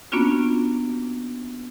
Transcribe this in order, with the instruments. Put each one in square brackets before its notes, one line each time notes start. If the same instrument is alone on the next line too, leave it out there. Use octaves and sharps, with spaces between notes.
[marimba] A#3 B3 C#4 D4 F4 F#4